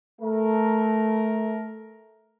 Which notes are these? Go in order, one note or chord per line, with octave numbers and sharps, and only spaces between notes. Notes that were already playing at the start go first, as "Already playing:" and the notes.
A3 A#4